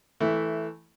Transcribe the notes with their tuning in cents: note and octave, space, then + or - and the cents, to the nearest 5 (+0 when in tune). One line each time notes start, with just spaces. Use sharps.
E3 -5 A3 +0